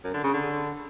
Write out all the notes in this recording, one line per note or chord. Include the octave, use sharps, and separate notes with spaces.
F#2
D3
C#3
D3